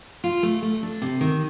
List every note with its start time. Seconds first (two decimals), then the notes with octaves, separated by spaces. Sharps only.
0.24 F4
0.43 A3
0.62 A3
0.83 D4
1.02 C3
1.21 D#3